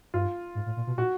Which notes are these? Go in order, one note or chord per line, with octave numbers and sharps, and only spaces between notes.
G2 F4
G#2
A2
A#2
B2
A#2 F#4